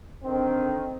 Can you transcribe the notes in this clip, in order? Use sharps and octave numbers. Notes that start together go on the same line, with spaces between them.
D3 D#3 C4